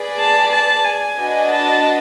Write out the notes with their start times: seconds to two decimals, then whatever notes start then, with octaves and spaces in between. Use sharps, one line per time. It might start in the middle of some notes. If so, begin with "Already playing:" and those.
Already playing: G#4 B4 D5
0.19 A5
0.52 A5
0.85 G#5
1.18 D4 F#4 B4 D#5
1.51 A5